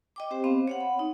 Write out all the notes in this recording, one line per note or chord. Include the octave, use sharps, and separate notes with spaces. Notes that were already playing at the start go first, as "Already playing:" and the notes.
D#5 G5 D6
C4 G4 C5
B3 C4 F5
C#5 F5 F#5
B5
D#4